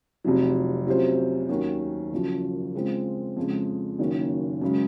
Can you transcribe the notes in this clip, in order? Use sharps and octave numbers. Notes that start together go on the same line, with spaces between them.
F1 F2 C3 F#3
C3 F#3 C#4 F4 C5
D#2 D#3 F#3 C#4
F#1 F#2 F3
C#3 G#3 C4 F4
F2 C#3 G#3
F#1 F#2 D#3 A#3 C#4
F#2 C#3 G#3